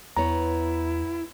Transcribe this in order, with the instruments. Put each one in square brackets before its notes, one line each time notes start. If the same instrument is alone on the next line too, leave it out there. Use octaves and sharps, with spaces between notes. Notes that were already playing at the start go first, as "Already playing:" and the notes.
[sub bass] E2 [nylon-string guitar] B3 C#5 [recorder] E4 [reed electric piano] A#5